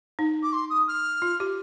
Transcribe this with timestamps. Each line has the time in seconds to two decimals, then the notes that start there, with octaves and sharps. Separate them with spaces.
0.19 D#4
0.43 D6
0.53 C6
0.70 D#6
0.88 F6
1.22 F4
1.40 G4